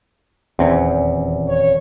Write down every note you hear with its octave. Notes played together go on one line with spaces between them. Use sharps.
D#1 E2 C4 C#4
C#5